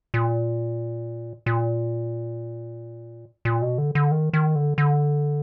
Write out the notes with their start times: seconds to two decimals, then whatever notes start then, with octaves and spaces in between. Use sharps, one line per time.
0.14 A#2
1.46 A#2
3.45 A#2
3.62 B2
3.78 D3
3.95 D3
4.12 D#3
4.33 D#3
4.56 D3
4.78 D3